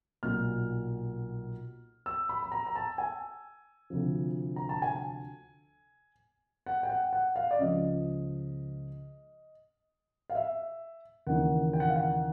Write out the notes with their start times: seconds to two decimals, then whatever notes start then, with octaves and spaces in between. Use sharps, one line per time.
0.23 B1 A#2 F#3 F6
2.06 E6
2.29 B5
2.43 B5
2.52 A#5
2.67 A#5
2.76 A5
2.98 G#5
3.90 D2 C3 F3
4.56 A#5
4.69 A5
4.82 G#5
6.66 F#5
6.83 G5
6.89 F#5
7.13 F#5
7.36 F5
7.51 D5
7.59 C#2 C#3 F3 D#5
10.30 F5
10.35 E5
11.27 D#2 C#3 E3 F#5
11.73 G5
11.80 F#5
11.89 F5
11.96 F#5